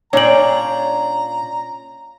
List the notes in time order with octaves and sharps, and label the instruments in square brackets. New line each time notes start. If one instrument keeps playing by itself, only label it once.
[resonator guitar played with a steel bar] A#2 D4 [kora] C#4 G5 [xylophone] C#5 F#7 [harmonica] A#5